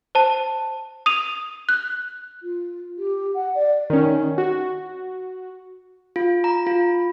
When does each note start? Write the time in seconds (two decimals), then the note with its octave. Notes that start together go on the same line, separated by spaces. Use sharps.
0.15 C5 A5
1.06 D#6 D#7 F7
1.69 F#6
2.43 F4
2.98 G4
3.34 F#5
3.55 D5
3.90 D#3 C#4
4.38 F#4
6.16 F4
6.44 A#5
6.67 F4